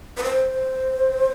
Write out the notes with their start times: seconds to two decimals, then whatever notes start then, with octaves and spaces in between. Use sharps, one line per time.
0.17 B4
0.23 C5